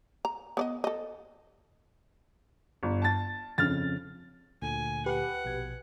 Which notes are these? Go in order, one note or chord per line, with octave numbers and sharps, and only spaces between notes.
A#5
B3 D5 D#5
A4 D#5
G1
A5 A6
F2 C#3 F6 A6
D2 A#2 D3 G#5
G4 B4 F#5
A#1 B2 G#6